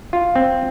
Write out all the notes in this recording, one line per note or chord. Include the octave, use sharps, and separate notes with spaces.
F4
C4